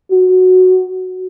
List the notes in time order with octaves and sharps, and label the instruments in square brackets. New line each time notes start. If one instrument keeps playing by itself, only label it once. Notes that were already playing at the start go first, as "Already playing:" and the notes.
[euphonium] F#4